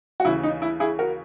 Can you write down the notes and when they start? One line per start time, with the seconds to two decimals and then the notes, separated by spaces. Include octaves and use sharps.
0.20 F#4
0.25 D#2 C#3 E3 E4
0.43 D#4
0.62 E4
0.80 E4 G#4
0.99 F#4 A#4